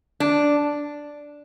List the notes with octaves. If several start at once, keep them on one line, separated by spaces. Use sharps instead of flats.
D4